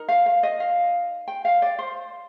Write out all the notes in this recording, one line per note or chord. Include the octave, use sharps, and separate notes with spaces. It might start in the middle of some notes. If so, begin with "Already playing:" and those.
Already playing: D#4 A#4
F5
F5
D#5
F5
G5
F5
D5
C5